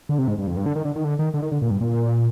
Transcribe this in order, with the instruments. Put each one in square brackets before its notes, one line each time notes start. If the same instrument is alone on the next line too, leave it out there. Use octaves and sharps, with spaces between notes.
[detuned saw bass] D3
C3
G#2
G2
F2
G2
D3
D#3
D3
D#3
D3
D#3
D3
D#3
D3
A#2
G2
A#2